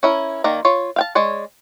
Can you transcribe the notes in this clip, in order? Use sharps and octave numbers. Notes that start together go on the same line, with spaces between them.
C#4 E4 A#4
D#3 A#3 D5 A#5
F4 C#5
F5 G5 A5
G#3 C#5 D5